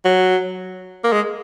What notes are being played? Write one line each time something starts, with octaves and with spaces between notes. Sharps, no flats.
F#3
A#3
G#3